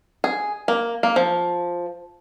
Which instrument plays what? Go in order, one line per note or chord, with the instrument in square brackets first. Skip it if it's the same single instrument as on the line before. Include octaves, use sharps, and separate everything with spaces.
[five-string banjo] G#4
A#3
A#3
F3